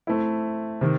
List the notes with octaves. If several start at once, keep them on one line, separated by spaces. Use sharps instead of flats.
A3 C4 E4
C3 D#3